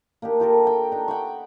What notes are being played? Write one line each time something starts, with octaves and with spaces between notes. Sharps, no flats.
A#3 D4 D#4 G4
F4 G4 A4 A#4
G5
D4 D#4
F#5 G5 B5 C#6